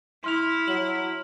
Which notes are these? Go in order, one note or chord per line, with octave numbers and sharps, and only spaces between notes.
E4 C6 F6 F7
F#3 F#7